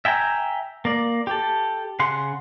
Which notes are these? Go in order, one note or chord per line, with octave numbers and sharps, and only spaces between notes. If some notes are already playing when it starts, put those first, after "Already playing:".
E5 G5 G#5 A#5
A#3 D5
G4 A4
C#3 F#5 C6